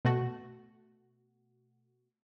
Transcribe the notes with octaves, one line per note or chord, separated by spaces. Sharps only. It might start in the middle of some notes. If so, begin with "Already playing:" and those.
B2 A3 F#4